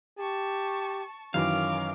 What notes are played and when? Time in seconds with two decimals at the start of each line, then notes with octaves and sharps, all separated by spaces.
0.19 G4 A5 C#6
1.34 F#2 D#3 E3 C#4 A#4 F5 D6